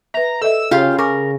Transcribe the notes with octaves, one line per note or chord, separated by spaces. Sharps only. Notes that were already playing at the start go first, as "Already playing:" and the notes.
B4 E5 A#5
A4 D#5 E5 E6
C#3 F4 G4 F5
A#4 G#5 C#6 D6